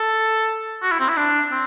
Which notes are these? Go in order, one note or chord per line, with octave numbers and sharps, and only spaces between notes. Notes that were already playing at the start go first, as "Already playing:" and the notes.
Already playing: A4
F#4
E4
C4
E4
D4
C4